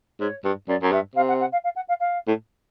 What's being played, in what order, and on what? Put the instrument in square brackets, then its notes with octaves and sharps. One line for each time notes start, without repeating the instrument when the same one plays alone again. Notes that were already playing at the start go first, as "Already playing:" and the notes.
[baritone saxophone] G#2 [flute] C#5
[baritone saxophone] G2
[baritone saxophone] F#2 [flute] D5
[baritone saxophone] F#2
[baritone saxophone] G2 [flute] E5
[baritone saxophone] C3 [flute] F5
[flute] F#5
F#5
F5
F5
F#5
F5
F5
[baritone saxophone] A2